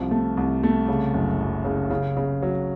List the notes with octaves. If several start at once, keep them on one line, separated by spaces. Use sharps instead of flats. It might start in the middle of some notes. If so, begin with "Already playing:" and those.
Already playing: C2 F3
A3
C2
A3
C#3
F#1
F#2
C#3
C#3
C#3
F#3